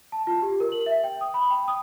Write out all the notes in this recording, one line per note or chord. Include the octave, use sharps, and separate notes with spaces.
A5
F4
G4
A#4
F#7
E5
G5
D#6
B5
G5
D#6